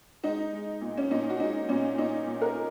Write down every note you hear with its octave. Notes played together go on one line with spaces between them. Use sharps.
G#3 D#4
G#3
A#2
C#4
A#2 D#4
F#4
G#3 D#4
A#2 C#4
A#2 D#4
A#2
A#4